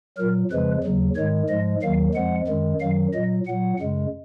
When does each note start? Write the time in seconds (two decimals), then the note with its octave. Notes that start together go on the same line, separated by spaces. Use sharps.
0.18 A#2 F#3 A#4
0.51 F2 C#3 F3 G#3 B4
0.83 D#2 C#3 F#3
1.16 G#2 D#3 G#3 C#5
1.49 G#2 F3 G#3 D#5
1.82 D#2 D#3 F#3 F5
2.15 F2 F3 G#3 F#5
2.48 F#2 D#3 G#3
2.81 F#2 D#3 F#3 F5
3.13 A#2 F#3 D#5
3.46 A#2 F#3 F#5
3.80 F#2 C#3 G#3